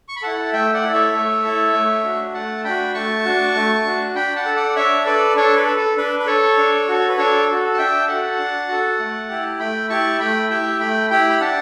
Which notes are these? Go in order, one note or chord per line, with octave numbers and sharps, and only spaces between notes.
C#6
B5
E4 A4 F#5 A5
A3 E5 G5
D5 F#5
E4 A4 D5
C#5 E5
A3
E4 A4
A3
D4 F#4
A3 F#5 A5
D4 F#4 G5 B5
A3 A5 C#6
D4 F#4
A3
D4 F#4
D4 G5 B5
F#5 A5
A4
D5 F#5
D4 C#5 E5
A4 B4 D5
D4 A4 C#5
B4
A4
A4
D4 B4
B4
A4 C#5
D4
F#4 A4
A4
B4
D4 A4 C#5
F#4 A4
A5
D4 E5 G5
F#4 A4 F#5 A5
D4
F#4 A4
A3
E4 G4
A3 G5 B5
E4 G4 A5 C#6
A3 G5 B5
E4 G4 E5 G5
A3 G5 B5
E4 G4 G5 B5
B5
D4 F#5 A5